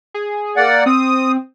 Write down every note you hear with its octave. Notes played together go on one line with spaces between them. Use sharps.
G#4
A#3 D5 F#5
C4 D#6